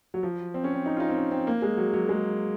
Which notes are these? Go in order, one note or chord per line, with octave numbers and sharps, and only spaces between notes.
F#3
F3
C4
C#4
C4
D#4
F4
D#4
C4
C#4
C4
A#3
G#3
F#3
F#3
G#3